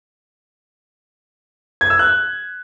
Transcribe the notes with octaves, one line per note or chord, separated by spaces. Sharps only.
G#6
E6
F#6